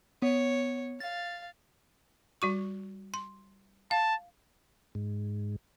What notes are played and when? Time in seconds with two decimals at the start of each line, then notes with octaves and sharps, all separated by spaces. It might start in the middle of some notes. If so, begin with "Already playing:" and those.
0.22 B3 C#5
1.00 F5 A6
2.42 G3 F#4 C#6
3.14 C6
3.91 F5 A5
4.95 G#2